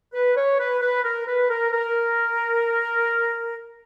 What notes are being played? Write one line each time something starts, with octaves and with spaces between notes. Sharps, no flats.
B4
C#5
B4
B4
A#4
B4
A#4
A#4